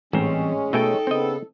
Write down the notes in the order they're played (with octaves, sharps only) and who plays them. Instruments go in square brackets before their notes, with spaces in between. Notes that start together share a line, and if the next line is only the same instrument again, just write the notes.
[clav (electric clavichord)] A1 G#2 [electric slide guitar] E3 G3 C4 [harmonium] G#3 C#4
[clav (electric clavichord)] B2 A3 G#5 [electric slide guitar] D#4 G5 [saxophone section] A4
[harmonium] C#3 B3 [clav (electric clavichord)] C4 D#5